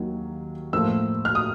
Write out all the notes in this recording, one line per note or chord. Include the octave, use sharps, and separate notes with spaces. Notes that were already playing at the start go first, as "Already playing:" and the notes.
Already playing: D#2 D#3 F#3 A#3
A2 F3 A#3 E6
F6
D#6